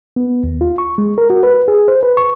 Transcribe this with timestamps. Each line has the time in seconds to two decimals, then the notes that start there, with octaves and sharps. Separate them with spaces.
0.16 B3
0.44 D#2
0.61 F4
0.78 C#6
0.98 G#3
1.18 A#4
1.30 F#4
1.43 B4
1.68 G#4
1.88 C5
2.03 B4
2.17 C#6